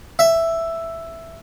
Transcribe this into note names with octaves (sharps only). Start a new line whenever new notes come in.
E5